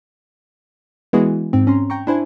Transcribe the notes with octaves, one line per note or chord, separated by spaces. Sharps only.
E3 G#3 B3 E4 F#4 G#4
G#2 C4
C#4 A#5 C6
G5 A#5 C#6
D4 E4 C5 G#5